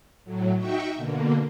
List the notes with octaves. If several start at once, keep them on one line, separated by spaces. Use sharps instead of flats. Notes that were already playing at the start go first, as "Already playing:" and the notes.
A2 F#3
D#4 F#4 E5 G5 C#6
B2 D3 A#3